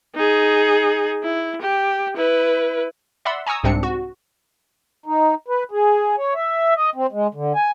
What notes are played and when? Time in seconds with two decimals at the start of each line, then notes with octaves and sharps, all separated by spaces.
0.15 D#4 G#4
1.23 E4
1.62 G4
2.17 E4 B4
3.25 D5 E5 F#5 B5 C6 E6
3.47 G#5 A#5 C#6 D#6 E6
3.63 C2 G#2 C3 C4 D4 C#7
3.83 F#4
5.06 D#4
5.48 B4
5.71 G#4
6.18 C#5
6.35 E5
6.76 D#5
6.95 C4
7.12 G#3
7.34 D3
7.55 G#5